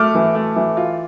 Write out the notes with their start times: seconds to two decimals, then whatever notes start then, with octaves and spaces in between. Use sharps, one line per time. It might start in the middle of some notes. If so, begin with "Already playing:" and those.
Already playing: A3 D6 F6
0.15 E3
0.35 A3
0.56 E3
0.77 F4